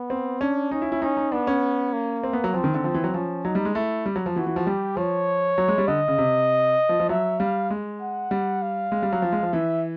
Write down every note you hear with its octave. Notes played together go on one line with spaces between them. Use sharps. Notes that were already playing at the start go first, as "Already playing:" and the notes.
Already playing: B3
C4
C#4 D4
C#4 D#4
E4
E4
C#4 D#4
D#4
B3 D4
C#4
A#3
C4
B3
F#3
F3 C4
D#3
D3
F3
E3
F#3
F3 C#4
F#3 D#4
G3
G#3
A3 E4
G3
F#3
F3
E3 F#4
E3
F3
G3 G4
F3 C#5
F#3
G#3
G3
D3 D#5
C#3
C3
F3
F3
F#3 E5
G3 F5
G#3
F#5
G3
F5
G#3
G3
F#3
F3
G#3
F3
E3 E5